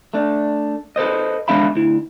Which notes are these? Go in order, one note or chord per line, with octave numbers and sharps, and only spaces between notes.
A3 D4
A4 B4 C5 D#5
D3 G#3 D4 E5 F5 B5
D2 E4